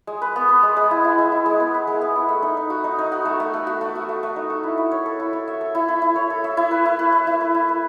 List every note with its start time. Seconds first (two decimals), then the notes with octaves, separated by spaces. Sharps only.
0.07 G#3
0.22 B4
0.36 B3
0.49 B4
0.63 G#3
0.77 G#3
0.91 E4
1.04 E4
1.18 G#3
1.32 E4
1.46 G#3
1.60 B3
1.74 B4
1.87 G#3
2.01 B3
2.16 E4
2.29 A3
2.42 D#4
2.57 D#4
2.70 F#4
2.84 D#4
2.99 D#4
3.12 F#4
3.25 A3
3.40 A3
3.54 A3
3.67 F#4
3.81 A3
3.95 F#4
4.09 A3
4.23 A3
4.36 D#4
4.50 A4
4.63 E4
4.78 E4
4.91 C#5
5.06 A4
5.20 E4
5.33 C#5
5.47 E5
5.61 A4
5.75 E4
5.88 E4
6.02 E4
6.16 C#5
6.30 A4
6.44 E5
6.57 E4
6.71 B4
6.85 E4
6.99 B4
7.12 B4
7.27 E4
7.41 B4
7.54 E4
7.69 B4